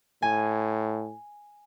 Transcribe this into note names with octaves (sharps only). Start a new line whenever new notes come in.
A2 G#5